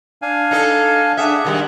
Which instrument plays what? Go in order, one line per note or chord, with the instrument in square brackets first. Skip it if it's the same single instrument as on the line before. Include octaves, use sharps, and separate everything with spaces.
[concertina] D4 F5 G#5
[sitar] D#4 A4
[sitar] D4 E5 [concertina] G#4 F#5
[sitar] D#3 F#3 G3